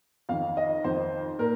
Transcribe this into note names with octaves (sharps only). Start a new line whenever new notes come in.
F2 D#3 F5
D#5
F2 D#3 C5
A#2 A#4